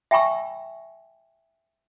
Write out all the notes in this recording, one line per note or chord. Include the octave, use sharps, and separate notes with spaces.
E5 G5 G#5 B5 C#6 E6